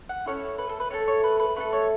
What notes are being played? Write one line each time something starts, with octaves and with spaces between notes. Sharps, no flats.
F#5
C#4 E4 A4 C#5
B4
A4
B4
A3 F#4 A4 C#5
C#5
B4
B4
A3 E4 A4 B4
C#5